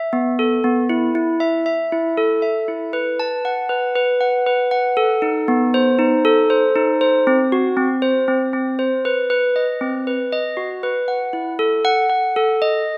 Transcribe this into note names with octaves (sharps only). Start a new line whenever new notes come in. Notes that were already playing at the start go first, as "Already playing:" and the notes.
Already playing: E5
B3
A4
B3
E4
E4
E5
E5
E4
A4
E5
E4
B4
A5
F#5
B4
B4
F#5
B4
F#5
A4
D#4
B3
C5
D#4
A4
C5
D#4
C5
C4
F#4
C4
C5
C4
C4
C5
B4
B4
D#5
C4
B4
D#5
F#4
B4
F#5
E4
A4
F#5
F#5
A4
D#5